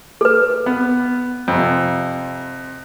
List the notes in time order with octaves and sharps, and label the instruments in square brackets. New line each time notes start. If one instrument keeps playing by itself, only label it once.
[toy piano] A4 B4
[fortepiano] B3
F2 C3